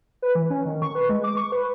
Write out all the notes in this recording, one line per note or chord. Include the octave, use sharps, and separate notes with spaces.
B4
E3
C#4
D#3
C#6
B4
G#3
D6
C#6
B4